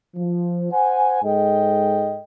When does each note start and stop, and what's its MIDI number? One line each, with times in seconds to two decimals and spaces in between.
0.15 0.68 53
0.72 1.22 72
0.72 1.22 78
0.72 1.22 80
1.23 2.21 44
1.23 2.21 56
1.23 2.21 69
1.23 2.21 75
1.23 2.21 79